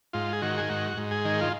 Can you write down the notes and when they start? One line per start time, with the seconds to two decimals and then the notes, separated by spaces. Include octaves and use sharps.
0.13 G#2 F4
0.33 G#4
0.42 D#3 F#4
0.58 G#4
0.69 G#2 F#4
0.97 G#2
1.11 G#4
1.25 D#3
1.41 F4